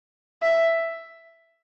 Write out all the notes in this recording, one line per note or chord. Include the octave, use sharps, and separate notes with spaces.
E5